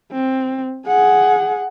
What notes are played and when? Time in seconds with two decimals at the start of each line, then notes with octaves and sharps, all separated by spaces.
0.12 C4
0.87 G#4 F#5